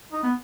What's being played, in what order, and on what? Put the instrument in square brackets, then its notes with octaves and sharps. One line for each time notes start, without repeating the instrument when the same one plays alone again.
[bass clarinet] D#4
B3